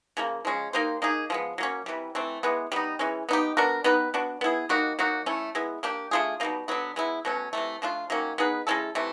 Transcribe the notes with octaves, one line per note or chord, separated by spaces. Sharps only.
C#3 F3 A#3
F3 G#3 C#4
A#3 D#4 G4 C5
A#3 D#4 G#4
F3 G#3 B3
F#3 A#3 C#4
C3 E3 G3
E3 A3 C4
E3 G#3 B3
G3 B3 D#4
E3 G#3 C#4
B3 D#4 G4
B3 D4 F#4 A#4
B3 D#4 G4 B4
B3 D4 F#4
B3 E4 G#4
G3 A#3 D#4 F#4
F#3 A#3 D#4 F#4
A3 C#4 E4
G#3 B3 E4
A#3 D4 G4
A3 D4 F4 G#4
B2 G3 A#3 D#4
D3 F#3 B3
G#3 B3 E4
B2 F#3 A3 C#4
C3 E3 A3
F3 A3 D4 F4
D#3 F#3 A#3 C#4
B3 D#4 G#4 B4
G#3 C#4 E4 A4
C3 E3 A3